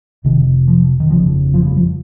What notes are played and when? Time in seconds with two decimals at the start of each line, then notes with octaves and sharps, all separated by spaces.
0.24 F1 F2 C3 D#3
0.68 F3
1.00 D#3
1.10 G1 F2 C#3 F3
1.54 F3
1.65 G3
1.77 F3